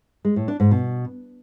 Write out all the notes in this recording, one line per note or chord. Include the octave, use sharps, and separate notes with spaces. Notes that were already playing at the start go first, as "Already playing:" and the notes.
G#3
A2
D4
G#2
B2